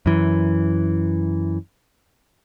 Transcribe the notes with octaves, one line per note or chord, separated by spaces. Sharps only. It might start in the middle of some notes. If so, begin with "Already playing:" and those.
F#2 E3